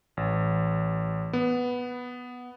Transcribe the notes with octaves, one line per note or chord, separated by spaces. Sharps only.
A1
B3